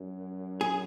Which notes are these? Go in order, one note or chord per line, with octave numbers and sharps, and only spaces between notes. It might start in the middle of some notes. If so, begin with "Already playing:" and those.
Already playing: F#2
G#4